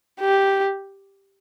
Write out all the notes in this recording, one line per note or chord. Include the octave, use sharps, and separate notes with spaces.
G4